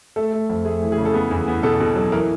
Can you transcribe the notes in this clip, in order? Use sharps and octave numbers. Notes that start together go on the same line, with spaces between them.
A3 A4
A3
F2
A3 G#4
E3
G#4
C#3
A4
B3 G#4
E2
B3
B2 A4
B2
F#3
E3 A#4